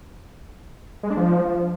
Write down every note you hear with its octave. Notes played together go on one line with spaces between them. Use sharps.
G#3
D4
F3